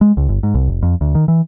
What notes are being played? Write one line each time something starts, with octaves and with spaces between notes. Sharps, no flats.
G#3
C#2
G1
G#2
C2
F1
F2
D2
D#3
E3